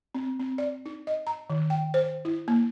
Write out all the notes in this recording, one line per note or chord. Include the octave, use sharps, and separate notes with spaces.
C4
C4
D5
D#4
D#5
A#5
D#3
G5
C5
E4
A#3